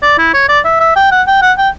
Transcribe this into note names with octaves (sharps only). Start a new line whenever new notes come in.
D5
E4
C#5
D5
E5
E5
G5
F#5
G5
F#5
G5